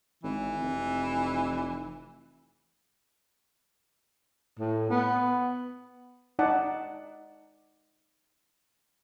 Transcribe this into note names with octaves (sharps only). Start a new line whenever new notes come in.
G#1 E3
F1
A2
B3
D#4 D5 F#5 A5